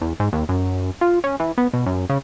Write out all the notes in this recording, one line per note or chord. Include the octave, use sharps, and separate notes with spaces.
E2
G#2
D#2
F#2
F4
C#4
E3
B3
B2
F#2
C#3